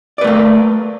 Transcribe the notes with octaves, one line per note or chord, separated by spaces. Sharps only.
A3 A#3 B4 D5